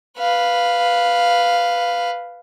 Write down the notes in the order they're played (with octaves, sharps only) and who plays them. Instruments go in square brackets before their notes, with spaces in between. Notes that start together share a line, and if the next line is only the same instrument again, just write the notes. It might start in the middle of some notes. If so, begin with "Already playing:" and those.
[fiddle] B4 F5